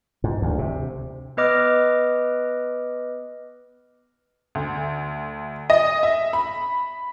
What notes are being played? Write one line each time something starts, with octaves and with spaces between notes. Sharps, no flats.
G#2
D2
C3
B3 B4 D#5 D6 F6
D2
D#5
E5
B5